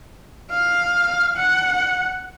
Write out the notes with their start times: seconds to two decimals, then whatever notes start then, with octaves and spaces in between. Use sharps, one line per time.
0.50 F5
1.37 F#5